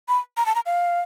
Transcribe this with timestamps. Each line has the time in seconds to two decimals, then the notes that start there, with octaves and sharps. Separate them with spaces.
0.08 B5
0.37 A#5
0.46 A5
0.55 A#5
0.66 F5